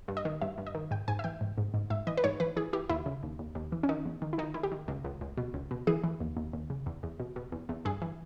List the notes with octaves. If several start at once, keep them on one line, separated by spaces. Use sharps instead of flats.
G2
D#5
D#3
G2 E5
G2
D#5
D#3
G#2 G5
G#2 G#5
E5
E3 G5
G#2
G#2
G#2
G#2 E5
E3 D#5
B4
G#2 C#5
E3 B4
E3 G#4
E3 G4
D#2 E4
C#3
D#2
D#2
D#2
E3
C#4
D#3 D#4
E2
D#3
E4
D#3 D#4
D#3 E4
G4
D#3
C#2
C#2
C#2
B2
C#2
B2
E3 G#4
E3
D#2
D#2
D#2
C#3
E2
E2
B2
B2
E2
E2
G2 G#4
E3